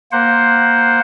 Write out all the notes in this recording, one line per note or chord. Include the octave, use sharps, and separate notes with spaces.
A#3 C5 F#5